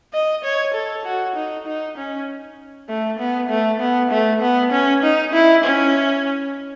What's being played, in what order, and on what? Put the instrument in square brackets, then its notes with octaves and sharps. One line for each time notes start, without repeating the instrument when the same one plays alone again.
[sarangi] D#5
C#5
A4
F#4
D#4
D#4
C#4
A3
B3
A3
B3
A3
B3
C#4
D#4
E4
C#4